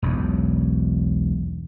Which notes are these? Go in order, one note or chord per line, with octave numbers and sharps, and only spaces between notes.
E1 B1 E2